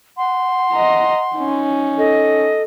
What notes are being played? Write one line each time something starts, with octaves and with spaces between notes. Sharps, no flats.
F#5 C6
D#5 A#5
C#4 D#4
A4 D#5